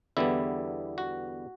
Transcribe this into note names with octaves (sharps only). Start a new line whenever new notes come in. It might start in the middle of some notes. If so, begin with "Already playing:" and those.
E2 D3 G3 B3 E4
F#4